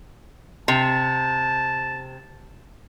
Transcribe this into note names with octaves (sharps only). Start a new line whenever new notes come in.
C3 A5